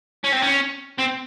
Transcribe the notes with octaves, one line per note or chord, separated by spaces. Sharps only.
C#4
C4
C#4
C4